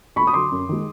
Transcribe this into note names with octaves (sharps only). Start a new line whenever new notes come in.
D2 B5 C#6
D#6
D3 F#3 C6 D6
F#2
D#3 G#3